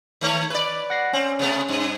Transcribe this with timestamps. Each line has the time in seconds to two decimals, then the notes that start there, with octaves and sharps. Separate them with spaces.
0.21 D#3 A3 C#5
0.50 B4 D5
0.90 F#5 A#6 C7
1.13 C4 C#4
1.39 C3 A3 B3
1.68 G2